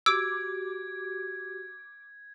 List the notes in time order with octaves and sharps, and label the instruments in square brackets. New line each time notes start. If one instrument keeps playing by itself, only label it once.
[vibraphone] F#4 G4 [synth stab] D6 [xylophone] E6 [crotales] G#6